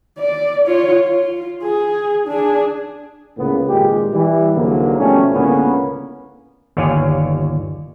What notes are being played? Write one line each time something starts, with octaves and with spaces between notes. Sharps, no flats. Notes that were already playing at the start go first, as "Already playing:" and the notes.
D5
F4 C#5
F4
G#4
D4 G#4
C#2 A2 C#3 A#3 B3
G#1 A#2 G#3 G4
E3 G3
C2 G#2 D3 F#3 A#3
B2 F3 G3 A3 C#4
C#2 A2 D3 A#3 B3 C#4
G1 D#2 C#5 D5 F5 G#5